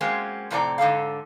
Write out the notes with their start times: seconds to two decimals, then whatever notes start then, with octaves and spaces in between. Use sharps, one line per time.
0.01 F#3 G#3 A#3 C4 C#4
0.50 F2 A2 C3 C4 D5 A#5
0.78 G#2 D3 A4 F5